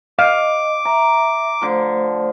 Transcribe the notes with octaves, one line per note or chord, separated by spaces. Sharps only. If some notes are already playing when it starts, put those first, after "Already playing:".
D#5 F5 D6
E5 A#5
D3 F3 A3 C5